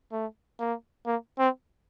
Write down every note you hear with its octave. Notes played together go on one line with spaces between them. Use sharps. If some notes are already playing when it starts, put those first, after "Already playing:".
A3
A#3
A#3
C4